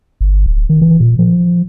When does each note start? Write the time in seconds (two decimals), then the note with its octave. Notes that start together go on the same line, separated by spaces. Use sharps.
0.21 G1
0.46 D1
0.70 D#3
0.82 E3
1.00 A#2
1.19 F3